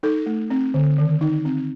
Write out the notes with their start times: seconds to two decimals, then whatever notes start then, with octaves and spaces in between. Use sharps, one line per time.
0.03 D#4 A4
0.26 A3
0.50 C4
0.74 D3
0.98 D#3
1.21 D#4
1.45 C4